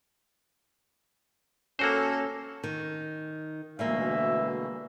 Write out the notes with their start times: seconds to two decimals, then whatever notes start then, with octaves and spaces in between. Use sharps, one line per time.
1.79 A#3 C#4 F#4 A4 C5
2.64 D#3
3.79 D2 B2 E3 G3 G#3 A#3 E5